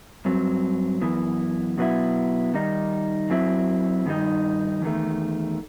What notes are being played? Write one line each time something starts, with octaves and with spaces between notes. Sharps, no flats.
G2 F#3 C4
F#2 E3 B3
B2 F#3 B3 E4
D#3 G3 D#4
F#2 F#3 C4 E4
G2 D#3 G3 D#4
E2 D#3 A3